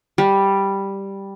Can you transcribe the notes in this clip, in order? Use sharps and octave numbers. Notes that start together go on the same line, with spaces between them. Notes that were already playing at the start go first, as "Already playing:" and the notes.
G3